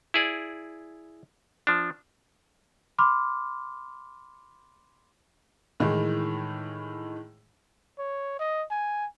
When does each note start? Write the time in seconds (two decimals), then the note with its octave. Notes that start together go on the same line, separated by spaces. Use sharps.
0.14 E4 G#4 D5
1.67 F3 D4
2.98 B5 C6 D6 F6
5.80 A2 D#3 E3 G#3
7.99 C#5
8.39 D#5
8.71 G#5